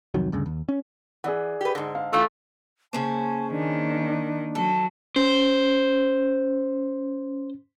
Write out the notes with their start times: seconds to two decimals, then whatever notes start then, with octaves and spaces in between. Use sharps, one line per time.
0.14 C2 F2 D#3 F#3
0.32 D2 G2 C#3
0.46 D#2
0.69 C#4
1.24 E3 G#4 D5 F#5
1.61 G4 B4
1.75 G#2 D3
1.95 F5
2.13 E3 A3 D4 F4
2.93 C#3 A#3 C#4 C5 A5
3.51 D#3 D4
4.55 F#3 A4
5.16 C#4 C5